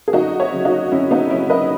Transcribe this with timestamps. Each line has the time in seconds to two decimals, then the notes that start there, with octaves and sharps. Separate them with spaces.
0.08 G#4
0.13 F#2 D#4 F#4
0.40 C#5 E5
0.52 C#3 F#3
0.65 D#4 F#4
0.92 F#2 C#4 E4
1.11 B3 D#4
1.30 C#3 F#3 C#4 E4
1.50 B4 D#5